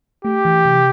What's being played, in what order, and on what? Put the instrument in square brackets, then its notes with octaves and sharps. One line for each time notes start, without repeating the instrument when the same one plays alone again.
[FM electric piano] A3 [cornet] G4
[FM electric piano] E3
C3